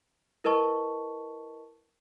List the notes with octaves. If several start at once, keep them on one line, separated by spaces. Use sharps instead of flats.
E4 A#4 B4 D#5 A5 C#6